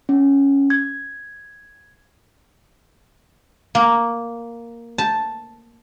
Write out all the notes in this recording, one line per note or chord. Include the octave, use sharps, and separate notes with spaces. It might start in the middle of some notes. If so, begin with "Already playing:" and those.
C#4
G#6
A#3
A5